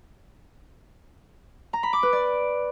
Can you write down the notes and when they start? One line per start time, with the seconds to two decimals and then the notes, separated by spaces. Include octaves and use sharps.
1.73 A#5
1.83 B5
1.93 D6
2.03 B4
2.13 D5